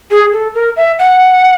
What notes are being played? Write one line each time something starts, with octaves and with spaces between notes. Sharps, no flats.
G#4
A4
A#4
E5
F#5